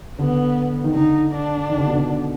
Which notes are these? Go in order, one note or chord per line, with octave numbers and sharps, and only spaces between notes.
D3 B3
D#3
D3 D#4
D4
D#3
D3
B2
D3